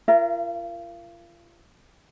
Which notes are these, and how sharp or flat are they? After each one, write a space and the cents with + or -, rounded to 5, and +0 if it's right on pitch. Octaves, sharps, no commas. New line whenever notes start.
F4 -35 A#4 +0 E5 +35